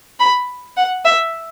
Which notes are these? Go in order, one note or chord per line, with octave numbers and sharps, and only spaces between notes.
B5
F#5
E5